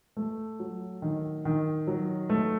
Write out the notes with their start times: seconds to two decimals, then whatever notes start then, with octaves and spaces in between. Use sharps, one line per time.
0.17 A3
0.60 F#3
1.02 D#3
1.45 D#3
1.87 F#3
2.30 A3